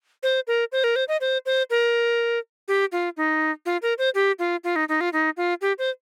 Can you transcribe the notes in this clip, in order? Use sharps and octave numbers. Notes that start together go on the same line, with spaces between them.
C5
A#4
C5
A#4
C5
D#5
C5
C5
A#4
G4
F4
D#4
F4
A#4
C5
G4
F4
F4
D#4
D#4
F4
D#4
F4
G4
C5